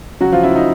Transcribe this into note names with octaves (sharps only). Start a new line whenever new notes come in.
C#3 F#3 F#4
F3 F4
C#3 E4
D#4